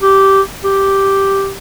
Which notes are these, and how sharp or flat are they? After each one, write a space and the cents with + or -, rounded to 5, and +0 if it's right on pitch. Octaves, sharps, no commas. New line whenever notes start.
G4 -10
G4 -5